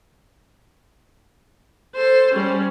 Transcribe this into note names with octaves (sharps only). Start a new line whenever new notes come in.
A4 C5
G3 C#4